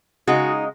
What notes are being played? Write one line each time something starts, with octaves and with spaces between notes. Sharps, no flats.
C#3 G#3 D#4 F#4